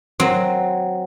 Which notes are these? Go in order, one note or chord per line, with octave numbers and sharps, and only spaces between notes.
F#3 C4